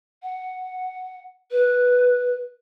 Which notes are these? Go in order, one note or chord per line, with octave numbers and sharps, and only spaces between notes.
F#5
B4